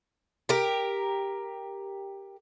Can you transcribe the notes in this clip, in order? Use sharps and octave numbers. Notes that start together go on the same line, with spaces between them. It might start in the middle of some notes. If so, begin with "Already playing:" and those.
G4 A#4